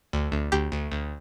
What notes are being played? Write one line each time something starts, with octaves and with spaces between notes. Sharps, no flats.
D2
D2
D2 G4
D2
D2